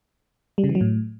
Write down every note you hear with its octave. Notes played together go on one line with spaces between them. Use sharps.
G3
C#3
E3
F#3
A2